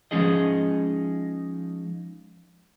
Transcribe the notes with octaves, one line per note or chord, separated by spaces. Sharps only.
F3 G#3 C#4 D#4 G#4 D#5